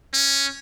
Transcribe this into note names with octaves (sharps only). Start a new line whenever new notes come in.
C#4